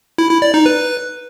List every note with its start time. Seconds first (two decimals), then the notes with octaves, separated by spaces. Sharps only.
0.18 E4
0.30 E4
0.42 D5
0.54 D#4
0.66 B4